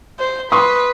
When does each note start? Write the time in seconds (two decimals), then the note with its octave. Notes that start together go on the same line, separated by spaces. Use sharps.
0.19 C5
0.52 B4 C6 C#6 D#6